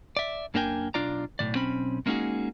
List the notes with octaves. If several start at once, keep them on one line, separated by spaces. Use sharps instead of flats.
D5 E5
F#2 A#3 D4 A#4 G5 G#5
B1 D4 F4 D5 A#5
B1 A2 C3 D5
B1 C4 C#4 B5
G#3 A#3 C#4 D#4 F#4 G#4